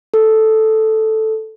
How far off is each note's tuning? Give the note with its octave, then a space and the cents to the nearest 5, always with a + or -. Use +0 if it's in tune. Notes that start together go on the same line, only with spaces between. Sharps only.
A4 -5